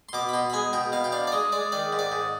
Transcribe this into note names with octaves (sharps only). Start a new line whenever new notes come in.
C6
B2 D6
B5
B2 C6
B5
G#3 G#5
B2 G5
B2 F5
G5
D4 F5
D5
G#3 D#5
G#3 D5
D#3 D5
G#2
D5
G#2